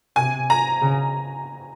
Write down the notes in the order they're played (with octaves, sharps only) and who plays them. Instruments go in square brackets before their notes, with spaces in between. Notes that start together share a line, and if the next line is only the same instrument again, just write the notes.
[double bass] C3 [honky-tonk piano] G#5
[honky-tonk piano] A#5
[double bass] C#3